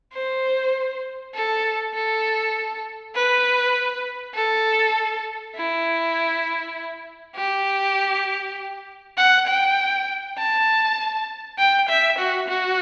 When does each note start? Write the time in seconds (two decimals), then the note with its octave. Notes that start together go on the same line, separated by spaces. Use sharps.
0.13 C5
1.35 A4
1.94 A4
3.15 B4
4.35 A4
5.56 E4
7.36 G4
9.17 F#5
9.47 G5
10.37 A5
11.58 G5
11.89 E5
12.18 F#4
12.48 F#4